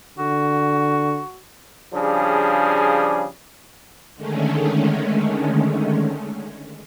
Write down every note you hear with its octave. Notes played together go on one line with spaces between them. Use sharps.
D3 F#4
C#3 F3 G3 D4 G#4
D3 D#3 G#3 A3 C#4